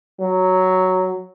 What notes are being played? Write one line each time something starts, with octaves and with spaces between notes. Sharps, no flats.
F#3